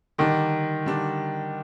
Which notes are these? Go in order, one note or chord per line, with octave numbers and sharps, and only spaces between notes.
D3 D#3 G3 D4
D3 G3 D4